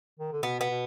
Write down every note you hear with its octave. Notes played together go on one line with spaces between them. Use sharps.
D#3
D3
B2 B3
B3
B2